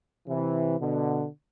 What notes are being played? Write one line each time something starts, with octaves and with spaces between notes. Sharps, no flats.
C3 E3
B2 D3